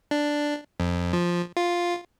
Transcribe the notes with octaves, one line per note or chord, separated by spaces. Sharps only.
D4
F2
F3
F4